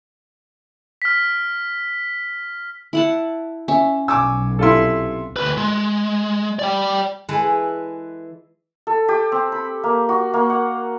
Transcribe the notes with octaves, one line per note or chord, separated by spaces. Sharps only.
F6 B6
E4 F#5 A5
C#4 E5
B1 G#5 C#6 D6 E6
C3 E4 F4 A4 C6
D2 B4
G#3
D5 G5
E3 G#3 A4 B4
A4
G4
C4
B5
A#3
F#4
A#3
F#5